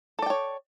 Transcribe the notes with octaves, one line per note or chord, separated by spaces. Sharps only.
A4 C#5 D5 G5